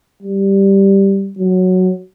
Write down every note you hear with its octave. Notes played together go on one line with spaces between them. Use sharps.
G3
F#3